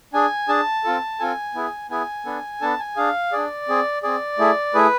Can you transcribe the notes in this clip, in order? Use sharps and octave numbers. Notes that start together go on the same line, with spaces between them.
D4 G#4 G#5
D4 G#4 A5
C4 F4 A4
C4 F4 A4 G#5
B3 E4 G#4
B3 E4 G#4 G#5
B3 D4 A4
B3 D4 A4 A5
G#5
D4 G#4 F5
D4 G#4 D5
C4 G#4
C4 G#4 D5
A3 E4 G#4
A3 E4 G#4 B4